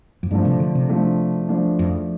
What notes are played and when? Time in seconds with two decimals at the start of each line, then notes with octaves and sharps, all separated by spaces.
0.23 F2
0.31 G2 F3 A3 D4
0.45 C3
0.60 D3
0.75 C3
0.89 F3 A3 D4
1.49 F3 A3 D4
1.79 F2